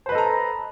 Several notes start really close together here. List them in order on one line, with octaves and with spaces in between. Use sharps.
C5 B4 D#5 A4 A#5